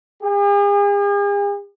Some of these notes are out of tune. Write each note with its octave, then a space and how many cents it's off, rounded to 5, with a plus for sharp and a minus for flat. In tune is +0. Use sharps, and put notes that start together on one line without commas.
G#4 -45